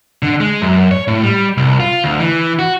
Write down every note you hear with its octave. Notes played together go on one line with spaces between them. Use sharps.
D3
G#3
F#2
C#5
A2
G3
C2
F4
D2
E3
F#4